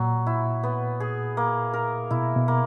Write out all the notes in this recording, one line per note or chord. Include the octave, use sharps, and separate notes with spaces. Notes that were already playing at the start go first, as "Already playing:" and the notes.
Already playing: A#2 F#3
E4
B3
G#4
A#3
A#4
B2 E4
B2
A#3